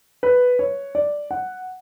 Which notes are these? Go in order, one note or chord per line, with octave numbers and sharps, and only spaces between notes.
B4
C#5
D5
F#5